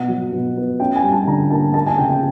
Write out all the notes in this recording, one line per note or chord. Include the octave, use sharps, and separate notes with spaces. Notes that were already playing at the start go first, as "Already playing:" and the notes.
Already playing: B2 F#5
F#3
B2
B3
C#4 G5
G#5
G3
A5
D3 A#5
A#3 A5
A#3 A5
G#5
C#3 G5
G5